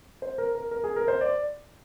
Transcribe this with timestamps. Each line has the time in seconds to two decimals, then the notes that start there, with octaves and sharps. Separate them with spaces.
0.22 C5
0.38 A#4
0.55 A#4
0.71 A#4
0.84 G#4
0.96 A#4
1.08 C5
1.21 D5